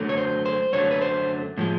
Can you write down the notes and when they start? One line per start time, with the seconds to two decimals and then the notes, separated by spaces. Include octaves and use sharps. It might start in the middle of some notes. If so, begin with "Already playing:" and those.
Already playing: F#2 D3 F#3 A3
0.09 C#5
0.17 C5
0.46 C5
0.73 F#2 D3 F#3 A3 C#5
0.91 B4
1.02 C5
1.58 A2 F3 G#3